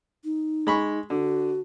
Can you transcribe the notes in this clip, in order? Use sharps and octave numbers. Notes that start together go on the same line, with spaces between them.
D#4
G#3 B5 C#6
D3 F#4